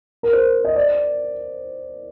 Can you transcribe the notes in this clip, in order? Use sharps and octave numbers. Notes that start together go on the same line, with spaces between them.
A#4
C5
D#5
D5